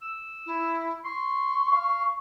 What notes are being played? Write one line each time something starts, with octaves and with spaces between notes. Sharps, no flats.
E6
E4
C6 C#6
F5